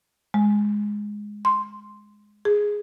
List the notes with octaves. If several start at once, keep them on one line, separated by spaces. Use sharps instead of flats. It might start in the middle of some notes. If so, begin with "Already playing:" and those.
G#3
C6
G#4